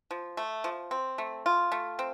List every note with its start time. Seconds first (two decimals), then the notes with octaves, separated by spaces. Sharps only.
0.11 F3
0.37 A3
0.64 F3
0.91 C4
1.18 A3
1.46 F4
1.72 A3
1.99 C4